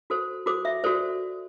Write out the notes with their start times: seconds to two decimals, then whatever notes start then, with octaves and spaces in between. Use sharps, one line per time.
0.10 F#4 A4 C5
0.46 F#4 A4 C5 D6
0.65 E5
0.84 F#4 A4 C5 D5